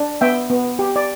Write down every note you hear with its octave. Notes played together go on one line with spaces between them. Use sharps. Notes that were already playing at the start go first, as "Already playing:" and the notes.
Already playing: D4
B3 E5 G5
B3
G4
D5